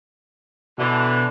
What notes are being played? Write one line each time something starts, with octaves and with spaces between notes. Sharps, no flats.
B2 D3 E3